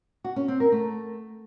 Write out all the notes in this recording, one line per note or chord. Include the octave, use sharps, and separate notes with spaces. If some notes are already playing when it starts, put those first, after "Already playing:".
F#4
C#4
C4
A#4
A3